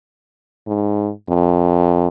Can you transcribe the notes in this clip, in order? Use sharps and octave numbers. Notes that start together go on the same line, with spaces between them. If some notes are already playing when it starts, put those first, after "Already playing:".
G#2
F2